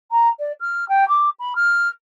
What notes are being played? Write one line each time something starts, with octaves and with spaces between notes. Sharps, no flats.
A#5
D5
F6
G5
D6
B5
F6